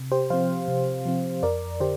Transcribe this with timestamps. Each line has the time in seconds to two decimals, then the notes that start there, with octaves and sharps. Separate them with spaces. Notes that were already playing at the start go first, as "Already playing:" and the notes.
Already playing: C3
0.12 G4 C5
0.30 F3 C4 C5 F5
0.68 C3
1.06 F3 C4
1.43 F2 A#4 D5
1.80 D3 G4 C5